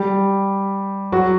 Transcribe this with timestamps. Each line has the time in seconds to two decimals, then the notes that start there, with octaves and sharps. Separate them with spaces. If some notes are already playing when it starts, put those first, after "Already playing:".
Already playing: G3 G4
1.12 F#3 F#4